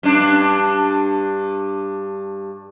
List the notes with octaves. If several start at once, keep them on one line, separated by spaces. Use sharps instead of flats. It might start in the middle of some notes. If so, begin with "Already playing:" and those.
G2 D4